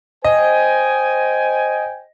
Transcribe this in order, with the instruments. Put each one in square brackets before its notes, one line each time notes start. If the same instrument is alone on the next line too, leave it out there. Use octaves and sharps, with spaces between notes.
[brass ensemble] C5 G5 G#5 [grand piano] D#5